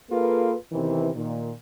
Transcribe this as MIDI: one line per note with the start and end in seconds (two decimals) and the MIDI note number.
0.10 0.54 58
0.10 0.54 65
0.10 0.54 68
0.10 0.54 69
0.10 0.54 71
0.72 1.09 40
0.72 1.09 48
0.72 1.09 51
0.72 1.09 52
1.14 1.51 46
1.14 1.51 51